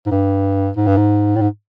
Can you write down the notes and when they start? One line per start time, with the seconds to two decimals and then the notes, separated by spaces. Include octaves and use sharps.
0.06 G#2
0.11 G2
0.77 G#2
0.87 G2
0.97 G#2
1.36 A2
1.41 G#2